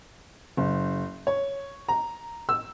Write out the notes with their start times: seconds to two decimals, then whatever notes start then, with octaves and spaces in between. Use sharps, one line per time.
0.57 F#1
1.27 C#5
1.89 A#5
2.49 E6